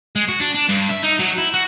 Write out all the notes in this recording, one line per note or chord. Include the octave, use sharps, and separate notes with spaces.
G#3
F#4
D4
D4
G2
E5
D#4
F#3
E4
F#4